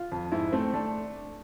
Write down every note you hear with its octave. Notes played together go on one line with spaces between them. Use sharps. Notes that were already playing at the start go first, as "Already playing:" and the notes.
Already playing: F4
F2
G#2 E4
A3 C4
A3 D4